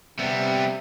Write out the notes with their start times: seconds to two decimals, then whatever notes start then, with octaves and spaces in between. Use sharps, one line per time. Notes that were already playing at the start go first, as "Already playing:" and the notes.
0.19 C3 G3 B3 E5